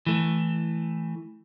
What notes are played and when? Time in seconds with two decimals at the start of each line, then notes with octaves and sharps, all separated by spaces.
0.07 E3 A3